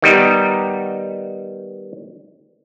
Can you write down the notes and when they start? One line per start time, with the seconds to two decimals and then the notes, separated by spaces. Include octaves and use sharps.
0.02 D#3 G3 B3 D#4